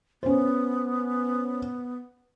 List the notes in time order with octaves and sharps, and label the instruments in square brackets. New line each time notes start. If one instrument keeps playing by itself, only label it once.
[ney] B3 [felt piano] C#4 C5